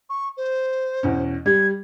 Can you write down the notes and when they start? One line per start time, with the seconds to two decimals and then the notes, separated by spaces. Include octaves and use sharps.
0.09 C#6
0.37 C5
1.03 E2 B2 C#4
1.46 G3 G#6